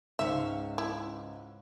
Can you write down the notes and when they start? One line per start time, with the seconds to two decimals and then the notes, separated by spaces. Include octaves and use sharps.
0.19 C#2 G#2 C#4 E5 F5
0.78 E4